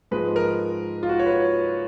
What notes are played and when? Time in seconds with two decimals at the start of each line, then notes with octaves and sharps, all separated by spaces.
0.11 G#2 F3 G#3 B4
0.36 A#4
1.03 F4
1.09 F#4
1.19 C#5
1.26 B4